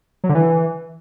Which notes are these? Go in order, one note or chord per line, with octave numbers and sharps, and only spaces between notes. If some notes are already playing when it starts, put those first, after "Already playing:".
F#3
D3
E3